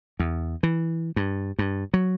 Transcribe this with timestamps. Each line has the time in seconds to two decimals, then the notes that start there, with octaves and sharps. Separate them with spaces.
0.19 E2
0.63 E3
1.16 G2
1.59 G2
1.94 F#3